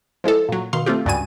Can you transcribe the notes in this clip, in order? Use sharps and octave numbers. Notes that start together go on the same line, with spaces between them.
F3 G#3 E4 A4
A#2 F#3
B2 D#3 F5 C6
A3 C4 F4 G4
C#2 G2 F#4 D5 G#5 D#7